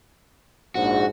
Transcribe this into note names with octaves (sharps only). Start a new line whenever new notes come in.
A#1 G#2 F#4